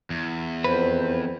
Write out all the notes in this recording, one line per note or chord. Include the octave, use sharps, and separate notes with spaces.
E2
F2 B4 C5